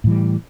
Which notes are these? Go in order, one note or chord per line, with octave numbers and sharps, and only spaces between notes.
A2 E3 G3